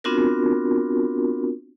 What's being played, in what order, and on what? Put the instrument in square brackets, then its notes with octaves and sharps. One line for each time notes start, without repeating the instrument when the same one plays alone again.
[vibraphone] B3 C4 D4 F4 F#4 A#4